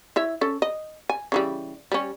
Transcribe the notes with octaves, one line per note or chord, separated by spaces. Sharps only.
E4 C#5 E5
C#4 A4
D#5
G#5
C#3 E3 G3
G3 C#4